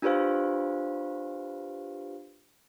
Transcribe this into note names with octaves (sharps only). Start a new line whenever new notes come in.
D4 F4 G4 B4 C5 F5